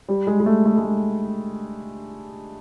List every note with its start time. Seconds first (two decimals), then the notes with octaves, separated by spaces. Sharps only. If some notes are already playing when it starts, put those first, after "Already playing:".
0.09 G3
0.27 G#3
0.40 G#3
0.46 A3
0.65 A3
0.77 G#3
0.83 A3